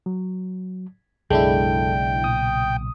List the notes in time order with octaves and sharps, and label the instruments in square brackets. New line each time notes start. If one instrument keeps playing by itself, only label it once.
[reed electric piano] F#3
[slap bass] B1 C#3 [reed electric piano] F#2 A4 [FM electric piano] G#3 D4 E4 [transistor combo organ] G5
[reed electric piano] A#2 [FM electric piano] D#6